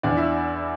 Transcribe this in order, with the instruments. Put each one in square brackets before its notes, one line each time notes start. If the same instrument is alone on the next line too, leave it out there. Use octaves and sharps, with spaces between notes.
[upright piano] E2 D4 D5
E4 E5